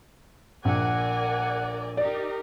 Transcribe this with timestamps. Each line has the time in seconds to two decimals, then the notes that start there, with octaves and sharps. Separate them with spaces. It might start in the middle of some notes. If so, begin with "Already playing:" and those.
0.65 A#1 A#4 D5 F#5 G#5
1.97 D#4 G4 A#4 D5